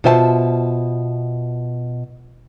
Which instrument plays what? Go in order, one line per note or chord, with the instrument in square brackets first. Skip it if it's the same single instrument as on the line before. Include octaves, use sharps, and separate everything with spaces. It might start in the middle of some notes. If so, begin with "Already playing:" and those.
[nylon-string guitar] B2 F4 C5 E5 G#5 A5